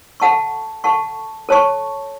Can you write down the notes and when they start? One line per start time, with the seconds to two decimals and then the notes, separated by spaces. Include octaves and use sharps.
0.20 A4 F#5 A5 C#6
0.84 A4 F#5 A5 C#6
1.49 A4 C#5 A5 C#6